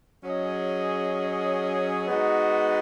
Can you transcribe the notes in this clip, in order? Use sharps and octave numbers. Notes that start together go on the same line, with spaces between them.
F#3 C#4 G#4 D#5
G#3 B3 D#4 F#4